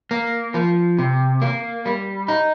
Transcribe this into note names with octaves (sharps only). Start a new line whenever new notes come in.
A#3
F3
C3
A#3
G3
D#4